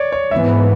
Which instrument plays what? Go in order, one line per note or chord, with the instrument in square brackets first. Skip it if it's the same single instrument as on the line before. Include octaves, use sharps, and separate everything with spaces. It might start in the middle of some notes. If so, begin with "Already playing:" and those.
Already playing: [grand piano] C#5 D5
C#5
[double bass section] G#2 E3 B3 [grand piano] E5